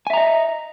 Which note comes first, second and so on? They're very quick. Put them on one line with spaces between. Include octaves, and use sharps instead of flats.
G#5 E5 A#5 D#5